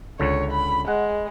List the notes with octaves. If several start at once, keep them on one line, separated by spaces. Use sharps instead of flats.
C#2 D3 C#5
B5
G#3 F#5